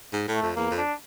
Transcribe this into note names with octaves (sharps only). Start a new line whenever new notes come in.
G#2
A2
A3
F2
E2 A#3
F2
D4